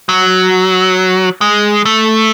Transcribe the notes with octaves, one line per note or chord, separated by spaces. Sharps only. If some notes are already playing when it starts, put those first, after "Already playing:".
F#3
G#3
A3